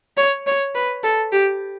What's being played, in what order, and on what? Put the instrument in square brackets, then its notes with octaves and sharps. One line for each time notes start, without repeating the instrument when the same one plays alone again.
[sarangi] C#5
C#5
B4
A4
G4